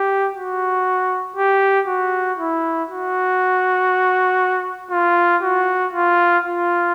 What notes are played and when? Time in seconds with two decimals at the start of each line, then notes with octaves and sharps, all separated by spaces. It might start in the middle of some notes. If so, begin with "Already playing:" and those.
Already playing: G4
0.35 F#4
1.36 G4
1.87 F#4
2.38 E4
2.89 F#4
4.91 F4
5.42 F#4
5.93 F4
6.44 F4